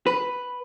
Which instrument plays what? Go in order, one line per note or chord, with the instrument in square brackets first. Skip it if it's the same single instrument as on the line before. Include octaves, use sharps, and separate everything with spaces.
[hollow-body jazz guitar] B4